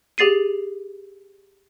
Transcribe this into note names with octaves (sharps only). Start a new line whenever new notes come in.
G4 G#4 A6 C7 D#7